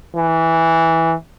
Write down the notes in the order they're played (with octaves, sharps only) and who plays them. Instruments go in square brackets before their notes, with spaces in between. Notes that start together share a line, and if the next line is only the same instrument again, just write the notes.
[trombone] E3